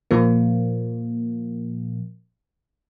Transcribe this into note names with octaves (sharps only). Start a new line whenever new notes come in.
A#2 F3 A#3